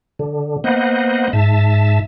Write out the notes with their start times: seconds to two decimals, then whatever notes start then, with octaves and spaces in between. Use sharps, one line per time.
0.19 D3
0.64 A#3 B3 C5 D#5 F#5
1.33 G#2 E5 A5